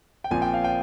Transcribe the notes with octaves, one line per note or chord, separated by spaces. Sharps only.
G5
A#1 A#2 F3 C4 G#5
G5
F5
G5